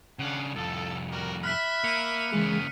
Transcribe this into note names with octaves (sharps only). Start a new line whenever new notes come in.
C#3 G3 D4 F5 F#5
C2 F2 A4
G3 F#4 A#4
E5 B5 F6 F#6 B6
A#3 C#7 D#7
C#3 E3 G#3 A#3 G#4